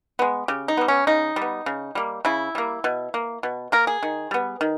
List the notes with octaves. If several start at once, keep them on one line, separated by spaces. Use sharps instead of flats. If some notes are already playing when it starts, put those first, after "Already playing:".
G#3 B3
C#3 G4
D#4
G3 B3
C#4
C#3 D#4
G3
B3
C#3
G3 A#3
C#3 E4
G3 A#3
B2
A#3
B2
A#3 A#4
G#4
D#3
G3 B3
D#3